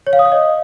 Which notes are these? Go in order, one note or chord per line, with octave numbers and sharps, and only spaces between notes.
C#5
F5
D#6
C#5
D#5